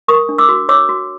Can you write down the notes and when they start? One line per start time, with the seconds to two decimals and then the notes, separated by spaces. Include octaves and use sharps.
0.08 A#4 C#6 D#6
0.29 D4
0.38 D6 E6
0.49 F#4
0.69 C#5 D6 E6
0.89 F#4